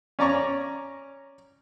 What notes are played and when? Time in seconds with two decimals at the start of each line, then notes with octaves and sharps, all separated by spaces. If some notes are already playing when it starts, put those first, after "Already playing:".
0.19 C#4 D5 A#5 C#6